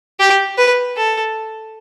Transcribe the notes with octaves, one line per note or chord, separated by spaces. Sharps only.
G4
B4
A4